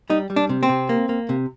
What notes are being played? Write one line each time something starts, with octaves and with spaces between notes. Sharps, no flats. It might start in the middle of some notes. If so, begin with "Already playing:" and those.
G3 D#4
G3
D4
C3
C4
C3
A#3
A#3
C3